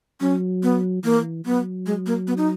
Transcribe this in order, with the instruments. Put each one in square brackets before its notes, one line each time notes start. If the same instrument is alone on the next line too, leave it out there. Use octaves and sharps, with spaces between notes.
[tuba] F#3 [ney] C#4
[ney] B3
[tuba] E3 [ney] A#3
[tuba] F#3 [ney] B3
[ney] G#3
A#3
B3
D#4